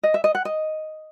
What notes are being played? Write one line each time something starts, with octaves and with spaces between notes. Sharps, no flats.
D#5
E5
D#5
F#5
D#5